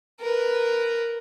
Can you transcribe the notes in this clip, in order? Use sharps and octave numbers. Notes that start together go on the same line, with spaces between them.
A#4 B4